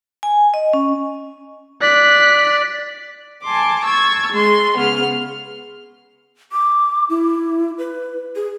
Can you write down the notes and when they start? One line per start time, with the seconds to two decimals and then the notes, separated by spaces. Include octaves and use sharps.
0.23 G#5
0.54 D#5
0.73 C#4
1.82 D5 F#6 B6
3.45 G#5 A5 C6 D6
3.84 C#6 E6 G#6 A6
4.32 G#3 C6
4.78 C#3 B3 F6
6.52 D6
7.09 E4
7.78 B4
8.36 G#4